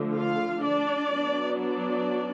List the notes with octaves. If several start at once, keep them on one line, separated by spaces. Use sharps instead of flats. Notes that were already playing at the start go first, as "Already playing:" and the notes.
Already playing: D3 F3 A3
F4 F5
D4 D5
F#3 B3 D4
D4 D5